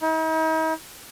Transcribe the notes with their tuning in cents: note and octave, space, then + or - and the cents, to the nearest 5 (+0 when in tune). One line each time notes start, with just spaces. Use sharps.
D#4 +45